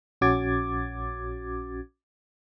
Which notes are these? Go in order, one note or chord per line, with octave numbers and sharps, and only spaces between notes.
A#1 C#4 F#4 D6 G#6 A6